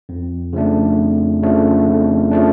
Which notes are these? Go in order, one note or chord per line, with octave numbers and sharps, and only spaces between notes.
F2
C#3 F3 A3 D4
F2
C#3 F3 A3 D4
F2
C#3 F3 A3 D4